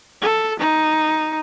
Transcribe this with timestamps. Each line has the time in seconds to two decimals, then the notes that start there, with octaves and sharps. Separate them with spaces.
0.22 A4
0.59 D#4